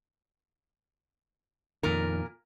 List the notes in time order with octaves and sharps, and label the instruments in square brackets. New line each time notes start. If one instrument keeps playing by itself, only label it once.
[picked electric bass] F2 D#3 [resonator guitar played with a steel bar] A#2 A#4